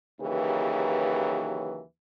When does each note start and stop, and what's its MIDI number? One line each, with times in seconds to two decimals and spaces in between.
0.20 1.80 39
0.20 1.80 49
0.20 1.80 52
0.20 1.80 54
0.20 1.80 67
0.20 1.80 71